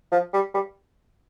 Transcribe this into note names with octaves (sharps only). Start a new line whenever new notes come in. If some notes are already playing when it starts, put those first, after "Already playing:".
F3
G3
G3